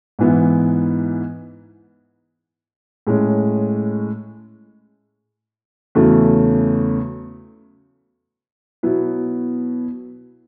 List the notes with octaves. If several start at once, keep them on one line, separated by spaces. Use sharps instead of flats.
G#2 E3 B3 E4
A2 G#3 C#4
E2 C#3 F#3 A3 E4
B2 F#3 B3 E4